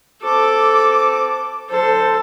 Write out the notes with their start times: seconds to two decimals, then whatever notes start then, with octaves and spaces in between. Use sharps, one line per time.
0.23 C4 F#4 A4 D6
1.70 D2 F#3 A4 C5